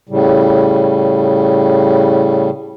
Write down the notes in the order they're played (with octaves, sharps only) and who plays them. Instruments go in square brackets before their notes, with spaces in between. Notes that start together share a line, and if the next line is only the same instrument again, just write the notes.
[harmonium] A2 C#3 G3